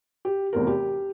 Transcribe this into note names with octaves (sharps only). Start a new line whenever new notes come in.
G4
F1 E2 A#4
G4